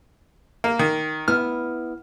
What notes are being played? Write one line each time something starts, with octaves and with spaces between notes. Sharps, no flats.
A#3
D#3
B3 E4 F6